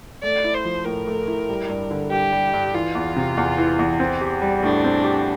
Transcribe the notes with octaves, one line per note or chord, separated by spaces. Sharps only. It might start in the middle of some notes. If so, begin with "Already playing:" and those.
A3 D5
E4
C5
F3
A2 A#4
A3
E4
G3
G2
D3
G2 G4
G3
G2
E3 F4
E2
C3
E2
E3
E2
C4
G4
G3
A2 D4
C4
G4